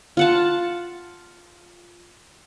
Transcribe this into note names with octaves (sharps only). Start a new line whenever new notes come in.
F4 F#5 A5